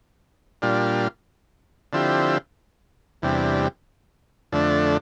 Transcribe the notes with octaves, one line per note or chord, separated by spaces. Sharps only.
A#2 G3 D4 F4
D3 F3 C4 E4 G4
E2 C3 G3 D4
F2 D3 A3 D4